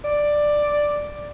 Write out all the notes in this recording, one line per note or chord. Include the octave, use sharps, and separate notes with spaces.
D5